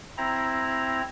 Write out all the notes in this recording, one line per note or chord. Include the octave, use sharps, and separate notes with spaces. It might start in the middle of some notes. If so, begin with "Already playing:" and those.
C4 E4 A#5